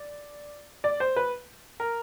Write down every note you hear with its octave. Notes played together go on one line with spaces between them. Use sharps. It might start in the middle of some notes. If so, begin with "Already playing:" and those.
Already playing: D5
D5
C5
B4
A#4